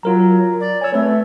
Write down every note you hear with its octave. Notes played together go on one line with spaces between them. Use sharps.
F#3 F4 A#4 A#5
D5
C#5 G#5 E6
A3 C4 B4